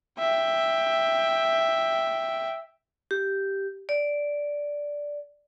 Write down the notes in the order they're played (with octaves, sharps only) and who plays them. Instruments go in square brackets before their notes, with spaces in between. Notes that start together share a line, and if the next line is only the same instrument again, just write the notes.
[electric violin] E5 G5
[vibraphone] G4
D5